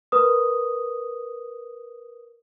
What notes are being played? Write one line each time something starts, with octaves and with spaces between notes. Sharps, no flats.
A#4 B4 D#6